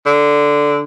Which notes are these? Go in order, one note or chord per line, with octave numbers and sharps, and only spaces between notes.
D3